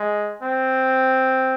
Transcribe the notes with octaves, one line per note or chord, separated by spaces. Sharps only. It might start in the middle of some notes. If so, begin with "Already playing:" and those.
Already playing: G#3
C4